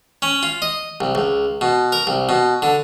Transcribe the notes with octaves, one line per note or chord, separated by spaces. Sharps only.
C#4
F4
D#5
C2
C#2
B2
A#4
C2
B2
D3